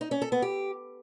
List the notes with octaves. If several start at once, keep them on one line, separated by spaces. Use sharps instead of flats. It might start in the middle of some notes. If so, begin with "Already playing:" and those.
D#4
C#4
A4
B3
G4